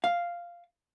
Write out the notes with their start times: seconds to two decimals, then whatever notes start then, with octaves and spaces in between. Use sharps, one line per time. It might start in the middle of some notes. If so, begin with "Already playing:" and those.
0.04 F5